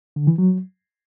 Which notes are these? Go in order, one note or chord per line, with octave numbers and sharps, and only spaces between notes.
D3
E3
F#3